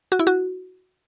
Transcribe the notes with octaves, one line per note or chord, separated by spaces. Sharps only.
F#4
E4
F#4